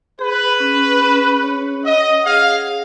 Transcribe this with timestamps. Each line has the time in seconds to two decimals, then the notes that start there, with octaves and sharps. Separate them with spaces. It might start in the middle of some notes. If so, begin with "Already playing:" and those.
0.19 G#4 B4
0.60 C#4
1.02 C#4
1.43 C#5
1.85 D#5 F#5
2.25 G#4 F5
2.68 G#4